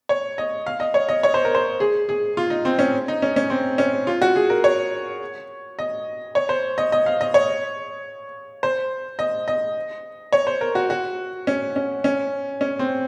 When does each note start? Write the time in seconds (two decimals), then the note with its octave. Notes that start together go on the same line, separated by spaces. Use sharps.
0.09 C#5
0.38 D#5
0.66 F5
0.80 D#5
0.94 C#5
1.09 D#5
1.23 C#5
1.34 C5
1.45 A#4
1.55 C5
1.80 G#4
2.09 G#4
2.37 F4
2.50 D#4
2.65 C4
2.79 C#4
3.08 D#4
3.22 C#4
3.36 C#4
3.50 C4
3.78 C#4
4.07 F4
4.22 F#4
4.36 G#4
4.50 A#4
4.64 C#5
5.79 D#5
6.35 C#5
6.49 C5
6.78 D#5
6.92 D#5
7.06 F5
7.21 D#5
7.34 C#5
8.63 C5
9.19 D#5
9.48 D#5
10.33 C#5
10.47 C5
10.61 A#4
10.75 F#4
10.90 F#4
11.47 C#4
11.76 C#4
12.04 C#4
12.61 C#4
12.79 C4